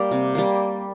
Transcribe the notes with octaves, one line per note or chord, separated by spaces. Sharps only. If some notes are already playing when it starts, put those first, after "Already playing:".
Already playing: G3 A#3 D5
C3
G3 A#3